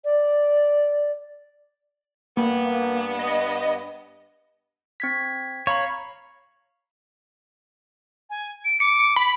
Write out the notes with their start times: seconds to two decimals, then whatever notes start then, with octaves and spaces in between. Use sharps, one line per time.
0.05 D5
2.37 G2 A#3 B3
3.19 D#5
5.00 C4 G#6 B6
5.67 C#5 F5 A#5 B5
8.30 G#5
8.65 D7
8.80 D6 C#7
9.16 B5